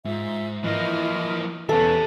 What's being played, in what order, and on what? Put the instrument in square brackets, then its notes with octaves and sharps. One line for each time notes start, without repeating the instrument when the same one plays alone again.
[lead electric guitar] G#2 [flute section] F4 E5 E6
[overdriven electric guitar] E3 A#3 [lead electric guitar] F3 [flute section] E4 D#5 F6
[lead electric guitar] E2 E3 [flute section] C#4 B4 F5 [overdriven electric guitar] G4 E5 [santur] A4